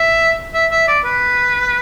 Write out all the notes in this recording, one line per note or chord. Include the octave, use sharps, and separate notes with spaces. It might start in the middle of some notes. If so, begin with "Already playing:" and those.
Already playing: E5
E5
E5
D5
B4